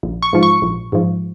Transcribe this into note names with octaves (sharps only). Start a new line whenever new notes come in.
A#1
C#6
G#2 F3
C#6
A#1
G#2 F3